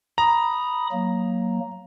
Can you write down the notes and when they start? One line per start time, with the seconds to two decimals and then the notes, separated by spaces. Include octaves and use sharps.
0.18 A#5 B5 D#6
0.92 F#3 A#3